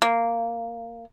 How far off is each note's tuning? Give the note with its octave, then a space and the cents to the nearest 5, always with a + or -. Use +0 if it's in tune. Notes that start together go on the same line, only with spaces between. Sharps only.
A#3 -10